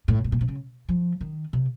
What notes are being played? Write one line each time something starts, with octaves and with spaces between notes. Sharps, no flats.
A2
A2
A#2
C3
C#3
F3
D#3
C3